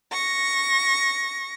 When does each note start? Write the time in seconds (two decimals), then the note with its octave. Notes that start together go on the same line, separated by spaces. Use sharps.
0.12 C#6 A#6